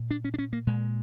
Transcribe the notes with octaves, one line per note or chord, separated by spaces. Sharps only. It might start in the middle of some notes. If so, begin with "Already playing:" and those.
Already playing: A#2
D4
C#4
D4
C#4
A#3
A#2 G#3